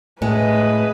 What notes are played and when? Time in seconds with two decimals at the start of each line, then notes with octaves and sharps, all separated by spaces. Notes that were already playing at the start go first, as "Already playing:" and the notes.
0.22 A2 G#3 B4 D#5